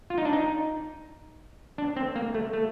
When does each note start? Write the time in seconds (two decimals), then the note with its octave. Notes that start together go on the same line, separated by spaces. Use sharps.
0.10 F4
0.18 D#4
0.25 D4
0.33 D#4
1.78 D4
1.96 C4
2.15 A#3
2.34 A3
2.53 A3